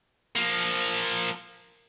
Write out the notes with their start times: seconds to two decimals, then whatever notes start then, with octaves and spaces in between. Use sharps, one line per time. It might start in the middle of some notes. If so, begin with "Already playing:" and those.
0.35 F3 A#3